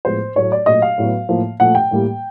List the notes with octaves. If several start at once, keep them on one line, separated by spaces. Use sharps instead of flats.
A2 F3 G#3 B3 C5
A2 F#3 A3 C#5
D5
A#2 F#3 A3 D#5
F5
A2 F#3 B3
A2 F3 A#3
A#2 F3 A3 F#5
G5
A2 E3 G3 A#3